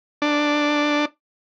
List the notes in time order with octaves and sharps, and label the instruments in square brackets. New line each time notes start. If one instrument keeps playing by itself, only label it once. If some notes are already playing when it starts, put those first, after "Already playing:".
[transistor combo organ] D4